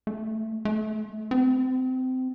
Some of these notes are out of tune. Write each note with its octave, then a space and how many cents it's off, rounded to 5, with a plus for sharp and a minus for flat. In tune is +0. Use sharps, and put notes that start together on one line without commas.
A3 +10
A3 -25
C4 -25